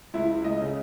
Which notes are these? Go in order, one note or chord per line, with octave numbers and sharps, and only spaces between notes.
C#2 E4
C#2
C#2 D#5
C#3